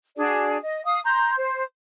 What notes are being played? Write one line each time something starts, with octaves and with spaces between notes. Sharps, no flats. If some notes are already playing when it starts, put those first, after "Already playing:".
D4 F#4 G#4 D5
D#5
F5 D#6
A#5 C6 G6
C5